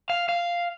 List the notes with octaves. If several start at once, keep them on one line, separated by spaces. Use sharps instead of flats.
F5
F5